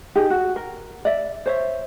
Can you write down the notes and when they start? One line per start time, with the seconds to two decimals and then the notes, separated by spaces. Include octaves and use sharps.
0.15 D#4 G4 G#4
0.30 F#4
0.56 A#4
1.05 D5 E5
1.46 C5 C#5 E5